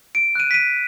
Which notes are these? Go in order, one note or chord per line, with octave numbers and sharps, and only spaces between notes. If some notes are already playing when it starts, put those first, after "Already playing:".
D7
F#6 D#7
B6 D#7